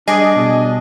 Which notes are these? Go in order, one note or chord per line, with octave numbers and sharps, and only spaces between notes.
G3 D4 G#4 D5 D#5
B2 G3